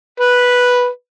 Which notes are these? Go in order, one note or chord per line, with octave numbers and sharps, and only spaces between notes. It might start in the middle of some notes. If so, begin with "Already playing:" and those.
B4